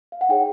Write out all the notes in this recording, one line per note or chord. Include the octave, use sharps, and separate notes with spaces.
F5
F#5
D#4 G#4 C#5 G5